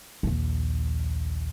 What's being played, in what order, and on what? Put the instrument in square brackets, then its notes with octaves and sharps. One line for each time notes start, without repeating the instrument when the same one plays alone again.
[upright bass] A#1 D#2